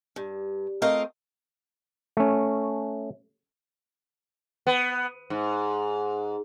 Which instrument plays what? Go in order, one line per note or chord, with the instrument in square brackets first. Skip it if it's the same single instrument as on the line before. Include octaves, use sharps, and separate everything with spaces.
[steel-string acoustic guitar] G2
A3 C4 F4 A#4 D#5 F5
[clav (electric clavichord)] A3 C#4
[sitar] B3
G#2